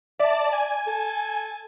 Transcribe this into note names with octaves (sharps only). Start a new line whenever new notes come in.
D5 E5 A5
G#5
A4